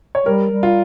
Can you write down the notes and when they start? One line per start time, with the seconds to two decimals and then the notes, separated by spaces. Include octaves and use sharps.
0.15 C#5
0.26 G3 A#4
0.50 G3
0.63 F4